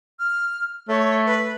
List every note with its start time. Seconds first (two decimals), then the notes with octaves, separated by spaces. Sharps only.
0.20 F6
0.88 A3 C#5
1.26 B4